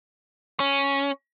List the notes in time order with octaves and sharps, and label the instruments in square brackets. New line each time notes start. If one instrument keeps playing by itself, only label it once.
[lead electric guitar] C#4